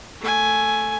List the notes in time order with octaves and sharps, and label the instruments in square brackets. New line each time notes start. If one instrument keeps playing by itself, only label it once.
[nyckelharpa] A3 G#5